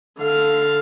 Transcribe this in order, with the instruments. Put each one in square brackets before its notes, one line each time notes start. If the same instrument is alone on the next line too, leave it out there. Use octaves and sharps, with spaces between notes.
[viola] D3 F5